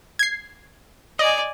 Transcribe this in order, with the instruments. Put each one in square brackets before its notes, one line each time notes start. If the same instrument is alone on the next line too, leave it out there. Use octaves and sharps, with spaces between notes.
[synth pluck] G#6 C7
[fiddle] D5 G#5 [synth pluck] D#5